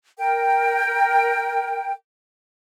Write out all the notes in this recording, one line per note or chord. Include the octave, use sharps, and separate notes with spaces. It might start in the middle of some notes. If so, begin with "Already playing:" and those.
A#4 G5